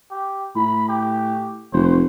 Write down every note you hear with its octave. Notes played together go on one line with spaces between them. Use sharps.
G4
A2 B5
G4
F1 C5